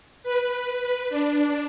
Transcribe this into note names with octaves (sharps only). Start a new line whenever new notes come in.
B4
D4